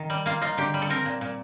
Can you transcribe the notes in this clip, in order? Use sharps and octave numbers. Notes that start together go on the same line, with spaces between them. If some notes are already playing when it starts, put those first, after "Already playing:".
Already playing: D#3
G3
A#3 F4
D#4 F4
D3 G4
G3
A4
C4 A#4
A#2
A#2